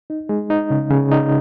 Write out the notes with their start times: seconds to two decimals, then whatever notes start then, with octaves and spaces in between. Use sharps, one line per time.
0.10 D#4
0.29 G#3
0.50 D#4
0.70 C#3
0.90 C#3
1.11 D#4